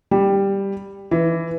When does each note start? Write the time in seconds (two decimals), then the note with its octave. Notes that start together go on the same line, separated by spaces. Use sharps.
0.11 G3
1.11 E3